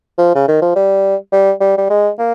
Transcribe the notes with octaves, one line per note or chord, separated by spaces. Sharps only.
F3
C#3
D#3
F3
G3
G3
G3
G3
G#3
A#3